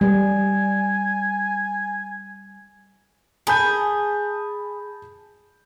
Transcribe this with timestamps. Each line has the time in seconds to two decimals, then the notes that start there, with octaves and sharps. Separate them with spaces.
0.01 G3 G#5
3.47 G#4 A5 B5 G6